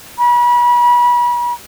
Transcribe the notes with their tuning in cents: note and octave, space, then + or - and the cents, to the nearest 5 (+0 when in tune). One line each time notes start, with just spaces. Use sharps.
B5 -35